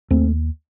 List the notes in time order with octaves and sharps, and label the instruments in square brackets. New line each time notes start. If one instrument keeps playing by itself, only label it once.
[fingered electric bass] D#2 A3 C4